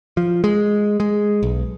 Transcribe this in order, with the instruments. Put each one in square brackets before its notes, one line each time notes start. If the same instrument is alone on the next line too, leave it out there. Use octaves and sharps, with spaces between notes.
[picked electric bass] F3
G#3
G#3
B1